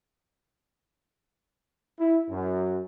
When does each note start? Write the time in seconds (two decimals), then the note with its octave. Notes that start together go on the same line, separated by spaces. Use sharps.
1.99 E4
2.30 F#2